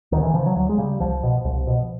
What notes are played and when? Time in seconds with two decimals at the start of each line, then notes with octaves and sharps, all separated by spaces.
0.12 D2 D#3
0.23 E3
0.34 C#3 F3
0.46 F#3
0.56 D2 F#3
0.69 G#3
0.78 C#3 G3
1.00 C2 F3
1.23 B2
1.45 C2
1.67 B2